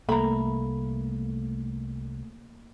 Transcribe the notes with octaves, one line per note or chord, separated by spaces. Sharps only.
C2 A3 A#3 A#5 B5